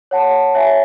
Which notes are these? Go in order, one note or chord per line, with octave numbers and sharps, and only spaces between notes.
C#5 F#5 A5
C#5 E5 G#5